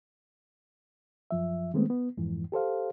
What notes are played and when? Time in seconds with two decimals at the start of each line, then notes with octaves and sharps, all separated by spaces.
1.31 F#2 F3 E5
1.74 D#3 G#3 A3 B3 C4
1.90 B3
2.17 F2 G#2 E3
2.52 G4 A4 C5 F5